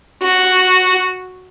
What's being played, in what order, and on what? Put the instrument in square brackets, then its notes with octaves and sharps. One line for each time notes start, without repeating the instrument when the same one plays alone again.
[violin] F#4